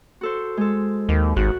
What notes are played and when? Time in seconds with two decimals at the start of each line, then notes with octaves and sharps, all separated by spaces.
0.21 F#4 A4 C5
0.57 G#3 A4
1.09 D#2
1.36 G#1 F#4 F#6